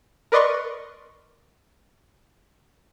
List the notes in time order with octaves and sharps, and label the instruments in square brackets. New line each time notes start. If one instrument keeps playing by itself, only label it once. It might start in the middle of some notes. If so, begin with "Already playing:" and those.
[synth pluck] A#4 B4 D5 D#5 C6 C#6